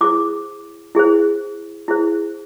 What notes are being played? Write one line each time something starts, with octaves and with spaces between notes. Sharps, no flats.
E4 G#4 C5 D6
E4 G#4 C5
E4 G#4 C5